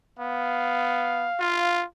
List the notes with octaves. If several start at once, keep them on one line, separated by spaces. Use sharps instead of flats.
B3 F5
F4